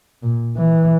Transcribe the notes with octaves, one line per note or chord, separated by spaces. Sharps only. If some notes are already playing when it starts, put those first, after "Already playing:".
A#2
E3